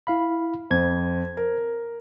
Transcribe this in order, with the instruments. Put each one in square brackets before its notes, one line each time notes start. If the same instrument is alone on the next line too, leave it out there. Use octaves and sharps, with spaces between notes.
[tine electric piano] E4 F5 B5
[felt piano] F2 [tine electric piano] C5 G#6
[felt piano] A#4